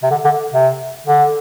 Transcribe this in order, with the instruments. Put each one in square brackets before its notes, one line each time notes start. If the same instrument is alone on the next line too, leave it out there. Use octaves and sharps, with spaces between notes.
[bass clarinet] C3
D3
D3
C3
D3